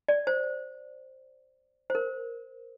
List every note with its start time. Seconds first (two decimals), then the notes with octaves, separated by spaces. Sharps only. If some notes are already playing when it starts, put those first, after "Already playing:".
0.08 D5
0.27 C5
1.90 C5
1.95 A#4